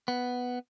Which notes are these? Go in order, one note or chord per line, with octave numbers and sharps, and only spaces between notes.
B3